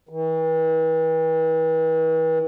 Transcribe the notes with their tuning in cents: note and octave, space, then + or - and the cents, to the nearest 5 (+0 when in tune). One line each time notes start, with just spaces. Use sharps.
E3 -40